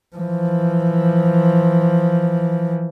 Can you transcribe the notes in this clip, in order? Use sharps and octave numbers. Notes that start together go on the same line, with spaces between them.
E3 F3